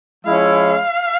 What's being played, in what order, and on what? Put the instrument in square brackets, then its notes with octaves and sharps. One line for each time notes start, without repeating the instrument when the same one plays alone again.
[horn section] F3 G#3 C#4 E4 [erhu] F5